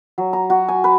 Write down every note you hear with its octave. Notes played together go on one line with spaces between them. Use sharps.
F#3
A#5
F#4
G#5
B4